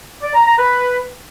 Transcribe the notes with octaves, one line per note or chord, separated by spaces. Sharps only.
D5
A#5
A#5
B4